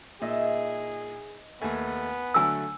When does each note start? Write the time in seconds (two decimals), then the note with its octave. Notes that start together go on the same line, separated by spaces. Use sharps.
0.22 A#2 D#4 G#4 D#5 E5
1.62 D#2 A3 B3 G#5
2.34 D3 F#3 A3 G#5 E6